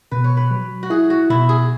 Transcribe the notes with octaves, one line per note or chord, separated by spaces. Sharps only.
B2 B4
C#5
B4
F#3
F#4
E4 G#4
F#4
B2 E4
G#4